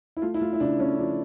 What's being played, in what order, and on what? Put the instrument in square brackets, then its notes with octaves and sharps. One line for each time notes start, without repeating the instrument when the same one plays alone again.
[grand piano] E4
A3 F4
E4
A3 F4
E4
C#3 D4
A3 C#4
F3 D4